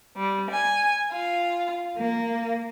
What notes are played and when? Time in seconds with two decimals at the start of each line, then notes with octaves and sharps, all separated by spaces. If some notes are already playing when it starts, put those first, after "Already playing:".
0.16 G3
0.49 G#5
1.11 F4
1.97 A#3